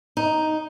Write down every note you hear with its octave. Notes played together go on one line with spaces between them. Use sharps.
D#4